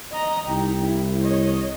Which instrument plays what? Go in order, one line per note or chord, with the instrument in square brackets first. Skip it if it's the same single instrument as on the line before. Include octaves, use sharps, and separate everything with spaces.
[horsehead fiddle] D#5 A#5
[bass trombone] C2 [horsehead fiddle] D#4 G4
[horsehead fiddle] E4
C#5 D#5